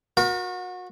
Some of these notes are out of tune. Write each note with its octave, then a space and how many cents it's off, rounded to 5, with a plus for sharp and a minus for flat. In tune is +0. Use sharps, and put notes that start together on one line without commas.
F#4 -30 A#4 +35